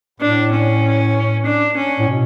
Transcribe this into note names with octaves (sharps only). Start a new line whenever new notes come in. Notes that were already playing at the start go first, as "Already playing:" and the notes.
A2 D4
C#4
D4
C#4
A2
B2